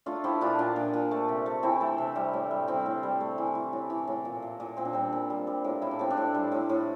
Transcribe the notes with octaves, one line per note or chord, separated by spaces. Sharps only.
A3 D4 F4
F3 E4 G4
A#2 D4 F4
A#2 D4
A#2
A#2
A3
C3
A3
E3 C4 E4
A3
C3
G3
A2
G3
G3 C4 E4
A2
G3
A3
E3
E3
A2
E3
A2
A#2
A#2
A#2
A#2 C4
D4
G3 C4
A#2
G3
G3
A2
A2 E4
D4
A2 C4
D4
A2
G3
A2
A2